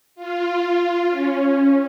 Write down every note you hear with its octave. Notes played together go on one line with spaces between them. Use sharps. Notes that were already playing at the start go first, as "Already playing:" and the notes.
F4
C#4